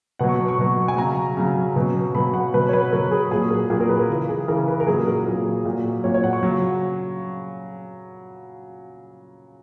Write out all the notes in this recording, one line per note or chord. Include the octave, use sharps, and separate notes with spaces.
B2 F#3 F#5
C#6
C#6
B2 F#3
G#5
C#3 F#3 A#5
C#3 F#3
B2 F#3
B2 F#3 B5
F#5
B2 F#3 B4
C#5
B4
B2 F#3 A#4
G#4
A#2 F#3 G#4
A#4
A#2 F#3 G#4
A#4
B4
A#4
C#3 E3
G#4
C#3 E3 A#4
B4
A#4
A#2 F#3 G#4
A#4
A#2 F#3
A#2 F#3
A#2 F#3 C#5
C#5
F#5
C#6
C#3 F#3